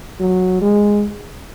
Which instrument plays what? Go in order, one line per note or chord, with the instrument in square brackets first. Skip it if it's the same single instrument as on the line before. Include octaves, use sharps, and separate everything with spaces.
[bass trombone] F#3
G#3